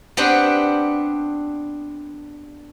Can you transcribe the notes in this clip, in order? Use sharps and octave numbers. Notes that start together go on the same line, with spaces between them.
B3 C4 D4 G4 F#5